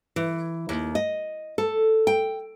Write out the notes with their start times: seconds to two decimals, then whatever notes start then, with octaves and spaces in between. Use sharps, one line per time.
0.16 E3
0.69 D#2
0.95 D#5
1.58 A4
2.07 G5